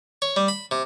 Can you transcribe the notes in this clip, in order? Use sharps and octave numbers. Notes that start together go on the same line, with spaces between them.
C#5
G3
B5
C3